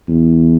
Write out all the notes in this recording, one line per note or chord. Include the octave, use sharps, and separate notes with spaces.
E2